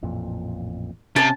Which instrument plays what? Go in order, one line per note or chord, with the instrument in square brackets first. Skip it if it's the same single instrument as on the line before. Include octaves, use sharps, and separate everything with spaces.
[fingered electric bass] A1 F2 A#2
[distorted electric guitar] C3 [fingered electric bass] C#4 [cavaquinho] A5